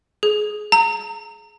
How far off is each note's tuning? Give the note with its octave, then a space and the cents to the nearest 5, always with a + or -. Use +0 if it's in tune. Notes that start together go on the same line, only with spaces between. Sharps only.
G#4 +25
A#5 -25